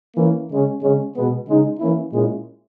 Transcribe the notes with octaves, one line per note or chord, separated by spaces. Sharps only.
E3 A#3 C#4 E4
C#3 G#3 C#4
C#3 G#3 C#4
B2 G#3 B3
C#3 G#3 D#4
E3 A#3 C#4 E4
A#2 G#3 C#4 E4